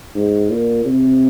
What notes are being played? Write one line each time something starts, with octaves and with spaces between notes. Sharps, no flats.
G#2
A#2
C3